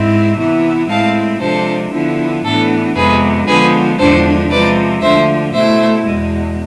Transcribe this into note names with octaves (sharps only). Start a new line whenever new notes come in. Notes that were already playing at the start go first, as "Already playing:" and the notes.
Already playing: G#2 G#3 C4 E4
C3 E3 B3 E4
A2 G#3 C4 E4 F5 A5
C3 F3 G#3 D4 A4 C5
D3 F3 B3 E4
A2 E3 B3 D4 A4
F2 C3 G#3 B3 G#4 B4
D3 F3 G#3 B3 G#4 B4
E2 D3 F3 G#3 D4 A4 C5
C3 F3 G#3 B4 D5
D2 D3 F3 C5 E5
B2 A3 E4 C5 E5
E2 B2 G#3